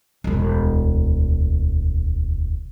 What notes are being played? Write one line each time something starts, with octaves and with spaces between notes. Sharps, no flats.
E1 D2